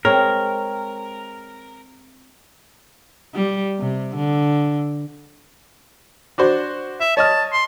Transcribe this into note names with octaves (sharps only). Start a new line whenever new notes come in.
G#3 C4 A#4 C#5
G3
C3
D3
D4 F#4 C5
E5
C#5 D#5 A5 F6
C6